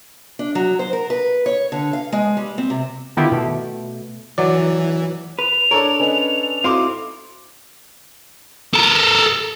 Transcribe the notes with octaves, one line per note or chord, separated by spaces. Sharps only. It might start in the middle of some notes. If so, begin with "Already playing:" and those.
D4
F#3
C5
A#4
B4
C#5
D3
F5
G#3
G3
C4
C3
D3 D#3 B3 E4 F4 G4
B2 A3
E3 F#3 D5
B4 F7
D4 A4 A#4 C#5
C#4 B4 D#5
C4 D#4 E4 F#4 A4 F5 C6 D6
A4 A#4